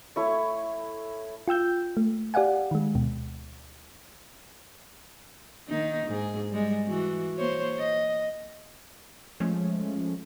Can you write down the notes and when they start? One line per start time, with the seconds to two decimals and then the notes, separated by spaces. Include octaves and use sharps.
0.16 A3 E4 C#5
1.48 F4 G5 E6 G6
1.97 A3
2.34 G4 D5 F5 F#5 G#5
2.71 D#3 G#3
2.95 D2 B2
5.69 D#3 A#3 D#4
6.07 G#2 G#4
6.51 G3 G#3
6.87 E3 F#4
7.37 A#3 C5 C#5
7.78 D#5
9.40 F3 G#3 A3 C#4